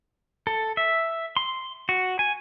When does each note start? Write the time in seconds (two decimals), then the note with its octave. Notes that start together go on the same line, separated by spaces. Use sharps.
0.47 A4
0.77 E5
1.37 C6
1.89 F#4
2.19 G#5